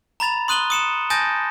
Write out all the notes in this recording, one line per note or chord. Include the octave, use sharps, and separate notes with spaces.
A#5 B5 A6 F7
C6 D#6 F#6 D#7 F#7 G7
D#6 C#7 E7
G#5 A5 D#6 G6 A6 A#6